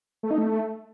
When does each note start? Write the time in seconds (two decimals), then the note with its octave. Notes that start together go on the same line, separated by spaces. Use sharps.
0.23 A3
0.31 D#4
0.38 A3